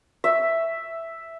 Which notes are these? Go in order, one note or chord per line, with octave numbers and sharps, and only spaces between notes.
E5